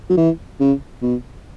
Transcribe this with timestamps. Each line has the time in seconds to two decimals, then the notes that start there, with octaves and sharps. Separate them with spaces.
0.09 F#3
0.17 E3
0.60 C#3
1.02 B2